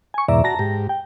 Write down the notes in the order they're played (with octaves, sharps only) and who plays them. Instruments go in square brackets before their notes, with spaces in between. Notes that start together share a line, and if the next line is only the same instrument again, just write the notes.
[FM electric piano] G#5 C#6
[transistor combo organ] E2 G#2 B2 [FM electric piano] D5 E5 A#5
[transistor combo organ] F#4 [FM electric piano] A5 A#5 A#6
[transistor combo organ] G#2 G4
[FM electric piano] G5